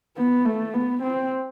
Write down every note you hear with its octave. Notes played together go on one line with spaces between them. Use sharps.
B3
A3
B3
C4